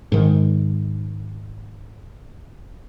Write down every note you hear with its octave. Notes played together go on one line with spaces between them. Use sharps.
G#2 D#3